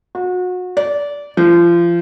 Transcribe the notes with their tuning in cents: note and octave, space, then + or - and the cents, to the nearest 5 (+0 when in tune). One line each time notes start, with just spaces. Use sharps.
F#4 -30
D5 -20
F3 -30